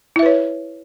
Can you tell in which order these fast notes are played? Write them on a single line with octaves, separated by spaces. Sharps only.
E4 E5 B4 C#5